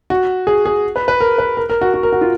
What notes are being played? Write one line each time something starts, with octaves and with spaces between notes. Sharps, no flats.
F#4
G#4
G#4
B4
B4
A#4
B4
A#4
A#4
F#4
F#4
A#4
F#4
F4